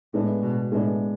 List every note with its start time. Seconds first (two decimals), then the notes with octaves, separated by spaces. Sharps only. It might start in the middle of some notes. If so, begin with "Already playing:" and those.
0.14 A2 G#3 B3 D4
0.42 B2
0.72 A2 G#3 B3 D4